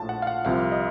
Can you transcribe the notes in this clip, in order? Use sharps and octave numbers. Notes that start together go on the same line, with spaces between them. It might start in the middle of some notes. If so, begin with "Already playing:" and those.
Already playing: A#1 A2 F3 A5
F#5
F5
F#5
C2 C3 F3 F5
D#5